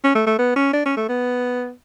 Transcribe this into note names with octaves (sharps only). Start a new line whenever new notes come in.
C#4
A3
A3
B3
C#4
D4
C#4
A3
B3